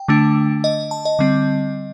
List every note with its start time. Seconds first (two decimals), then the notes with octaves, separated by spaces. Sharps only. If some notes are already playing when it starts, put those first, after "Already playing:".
Already playing: G5
0.08 D3 A3 D4
0.64 D#5
0.91 A5
1.05 D#5
1.19 D3 G3 C4